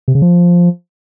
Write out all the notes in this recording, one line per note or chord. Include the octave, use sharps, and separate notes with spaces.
C3
C#3
F3